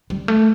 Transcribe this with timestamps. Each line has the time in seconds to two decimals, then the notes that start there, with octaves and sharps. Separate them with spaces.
0.10 G3
0.28 A3